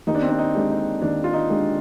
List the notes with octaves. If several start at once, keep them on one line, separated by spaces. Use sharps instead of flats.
D#2 D#4
D4
C4
D4
D#4
D3 G#3 D4 G4
D#4
D#2 D4
F4
D#4
D3 G#3 D4 G4